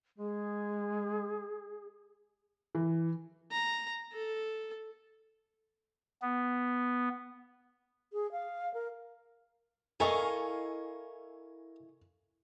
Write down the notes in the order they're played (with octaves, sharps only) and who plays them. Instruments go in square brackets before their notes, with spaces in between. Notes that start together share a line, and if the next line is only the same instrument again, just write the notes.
[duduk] G#3 [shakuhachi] G#4
[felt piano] E3
[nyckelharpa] A#5
A4
[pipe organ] B3
[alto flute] G#4
F5
A#4
[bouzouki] E4 D#5 F5 [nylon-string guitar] A4 [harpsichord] A#4 [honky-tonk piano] G#5 C#6